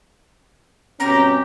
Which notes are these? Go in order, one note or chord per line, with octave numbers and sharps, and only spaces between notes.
G2 B2 C4 C#4 G4 A#5